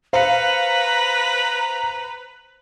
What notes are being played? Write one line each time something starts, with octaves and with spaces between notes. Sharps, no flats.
B4 C5 F5 A#5 C#7